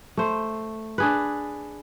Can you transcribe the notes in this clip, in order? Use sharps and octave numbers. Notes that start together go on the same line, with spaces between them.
A3 C5
D4 G#4 B4